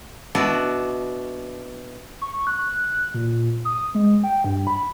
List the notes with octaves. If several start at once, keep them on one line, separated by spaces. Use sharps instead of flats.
B2 B3 D4 E4 F#4
C#6
F#6
A#2
D#6
G#3
G5
G2
B5